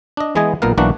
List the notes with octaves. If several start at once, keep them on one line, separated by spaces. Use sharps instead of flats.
D4 D#5
E3 G#3 B3 G#4 D#5 G#5
B1 A#2 B3 A#4 F5
B1 E3 A#3 D4 F#4 F#5